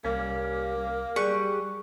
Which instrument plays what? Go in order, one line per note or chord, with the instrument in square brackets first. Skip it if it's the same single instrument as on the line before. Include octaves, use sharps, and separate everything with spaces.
[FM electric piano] C2 [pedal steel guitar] G3 C#4 [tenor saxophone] A#3
[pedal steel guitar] G3 G4 [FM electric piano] G#4 D5 F#6 [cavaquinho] C#6